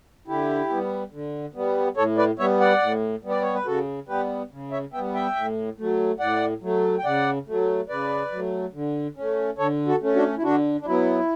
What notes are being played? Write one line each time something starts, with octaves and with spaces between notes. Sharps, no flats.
D3 E4 G4
G3 B3
D3
G3 B3
A2 A4 C#5
B4 D5
G3 B3 C#5 E5
D5 F#5
A2
G3 B3
D5
C#5
B4
C#3 F#4 A4
G3 B3 G4 B4
C#3
C#5 E5
B3 E5 G5
G3
E5 G5
A2
F#3 A3
A2 D5 F#5
F#3 A3
G5
C#3 D5 F#5
F#3 A3
C#3 B4 D5
F#3 A3
D3
A3 C#4
D3 A4 C#5
F#4 A4
A3 C#4
D4 F#4
E4
D3 D4 F#4
D4
F#3 B3 E4